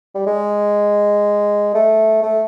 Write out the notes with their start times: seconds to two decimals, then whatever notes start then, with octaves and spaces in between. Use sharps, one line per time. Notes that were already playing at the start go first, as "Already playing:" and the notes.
0.15 G3
0.27 G#3
1.75 A3
2.23 A3